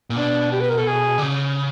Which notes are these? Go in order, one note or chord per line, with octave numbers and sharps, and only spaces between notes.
A#2
B2 D4
G4
B4
A#4
A4
G#4
D3
C#3